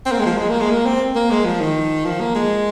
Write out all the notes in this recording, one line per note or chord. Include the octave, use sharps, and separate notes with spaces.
C4
A#3
G#3
F3
G#3
A#3
G#3
A#3
C4
A#3
G#3
F3
D#3
F3
A#3
G#3